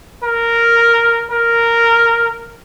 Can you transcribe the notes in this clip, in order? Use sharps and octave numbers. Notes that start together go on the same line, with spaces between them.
A#4
A#4